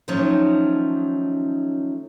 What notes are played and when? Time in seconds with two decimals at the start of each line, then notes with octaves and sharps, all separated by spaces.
0.08 D#3 F3 F#3 A3 C#4 D#4